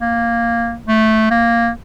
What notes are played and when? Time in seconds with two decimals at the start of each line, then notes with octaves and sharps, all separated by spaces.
0.01 A#3
0.88 A3
1.31 A#3